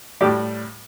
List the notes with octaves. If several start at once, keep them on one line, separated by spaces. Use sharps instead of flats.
A2 G3 G4